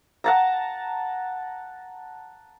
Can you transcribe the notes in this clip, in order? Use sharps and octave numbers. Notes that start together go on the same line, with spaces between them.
F#5 A5 A#5